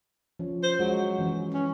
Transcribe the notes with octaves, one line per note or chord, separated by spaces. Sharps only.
F3 C#4
C5
F#3 G#3
E3 C#4
C#4